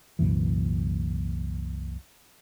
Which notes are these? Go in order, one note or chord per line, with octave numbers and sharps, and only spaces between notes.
C2 F#2 A#2 E3